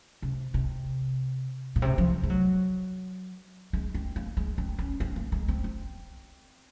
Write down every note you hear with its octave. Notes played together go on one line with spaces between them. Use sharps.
C3
C3
A#2
C3
F3
G#3
F#3
G#3
C4
A#3
G#3
C4
C#4
C4
A#3
G#3
C4
C4